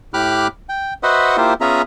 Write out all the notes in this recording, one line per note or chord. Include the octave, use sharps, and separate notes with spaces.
A2 G4 B5 D6 F6 F#6
G5
F#4 B4 C5 D#5 E5 F#5
A#3 E4 F4 G4 C5
B3 C#4 F4 G#4 E5 A#5